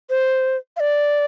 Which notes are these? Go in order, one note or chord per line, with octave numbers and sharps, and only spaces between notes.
C5
F5
D5